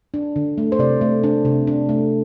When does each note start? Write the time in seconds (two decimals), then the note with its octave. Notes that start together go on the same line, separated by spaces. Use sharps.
0.14 D4
0.36 D3
0.58 A3
0.72 C5
0.79 C3 D5
1.01 A3
1.23 D4
1.45 C3
1.67 D4
1.89 A3